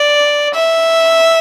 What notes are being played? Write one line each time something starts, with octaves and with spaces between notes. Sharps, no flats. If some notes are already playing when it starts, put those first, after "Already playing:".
Already playing: D5
E5